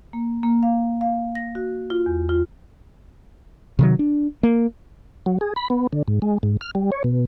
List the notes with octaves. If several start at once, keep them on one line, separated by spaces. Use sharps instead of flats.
A#3
A#3
F5
F5
A#6
F#4
F4
E2
F4
C3 D#3 F#3
D4
A#3
F#3
G#4
B5
B3
D3
G#2
G#3
G#2
F6
G3
C#5
B2